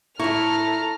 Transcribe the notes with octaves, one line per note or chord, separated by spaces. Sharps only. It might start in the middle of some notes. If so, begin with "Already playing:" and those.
A2 E4 A4 A#5 C#6 F6